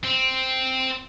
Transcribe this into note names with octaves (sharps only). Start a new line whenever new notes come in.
C4